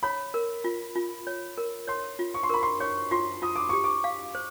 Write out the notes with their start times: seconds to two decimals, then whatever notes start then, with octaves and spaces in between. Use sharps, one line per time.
0.03 C#5 B5
0.34 A#4
0.64 F4
0.95 F4
1.27 C#5
1.58 A#4
1.88 C#5 C6
2.19 F4
2.34 C#6
2.43 C6
2.50 A#4 B5
2.63 C6
2.80 C#5 C#6
3.11 F4 C6
3.42 F4 D#6
3.56 D6
3.69 G4 C#6
3.84 D6
4.04 F5
4.35 C5